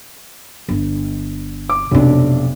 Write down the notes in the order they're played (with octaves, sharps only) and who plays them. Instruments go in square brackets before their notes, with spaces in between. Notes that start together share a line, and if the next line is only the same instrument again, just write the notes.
[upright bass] G1
[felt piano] D6
[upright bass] F1 C3 [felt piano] B1 D4